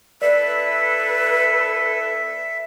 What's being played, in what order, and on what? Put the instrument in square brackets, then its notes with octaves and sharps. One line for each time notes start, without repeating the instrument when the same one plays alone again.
[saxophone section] B3 E4 A4 [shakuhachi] B4 [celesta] D5 [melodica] E5